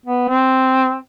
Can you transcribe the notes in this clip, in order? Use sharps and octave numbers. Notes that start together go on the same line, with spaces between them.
B3
C4